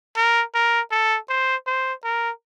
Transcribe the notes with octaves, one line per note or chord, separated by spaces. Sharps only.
A#4
A#4
A4
C5
C5
A#4